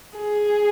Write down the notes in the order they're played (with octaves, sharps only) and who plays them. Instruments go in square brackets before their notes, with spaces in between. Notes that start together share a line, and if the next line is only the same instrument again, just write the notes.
[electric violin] G#4